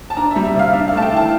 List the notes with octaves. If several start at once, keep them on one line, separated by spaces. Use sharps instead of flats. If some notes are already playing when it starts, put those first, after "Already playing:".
A5
D4 A#5
E5
G3
E5
C3 F5
D4 E5
F5
A3 A5
G5
E3 A5